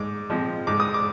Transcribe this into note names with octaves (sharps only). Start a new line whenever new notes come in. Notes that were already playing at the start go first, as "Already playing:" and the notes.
Already playing: G#2 D6
F3 G#3 C4
G#2 D6
D#6
D6